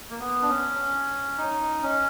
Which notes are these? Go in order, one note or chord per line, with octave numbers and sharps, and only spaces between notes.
A#3
B3
D4
C#4
D#4
C#4